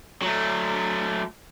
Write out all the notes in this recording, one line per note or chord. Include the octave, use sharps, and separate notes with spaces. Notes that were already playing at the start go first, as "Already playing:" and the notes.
F#3 A3